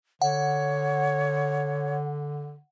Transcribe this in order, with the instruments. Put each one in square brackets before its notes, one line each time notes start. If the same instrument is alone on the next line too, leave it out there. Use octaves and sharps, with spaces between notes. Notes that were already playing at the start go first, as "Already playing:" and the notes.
[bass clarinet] D3 [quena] C#5 [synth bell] F#5